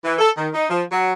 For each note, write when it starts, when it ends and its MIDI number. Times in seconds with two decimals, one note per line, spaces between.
0.03 0.15 52
0.18 0.29 69
0.36 0.48 51
0.53 0.65 63
0.68 0.83 53
0.91 1.12 54